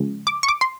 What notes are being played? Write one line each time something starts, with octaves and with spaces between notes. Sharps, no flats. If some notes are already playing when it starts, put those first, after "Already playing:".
Already playing: C#3 F3 G#3
D6
C#6
D6
C6